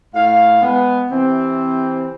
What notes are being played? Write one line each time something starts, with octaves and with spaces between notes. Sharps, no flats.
A2 F5
G#3 B3
C3 E3 C4